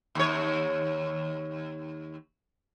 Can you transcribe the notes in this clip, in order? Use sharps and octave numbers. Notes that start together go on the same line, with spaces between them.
D#2 C#5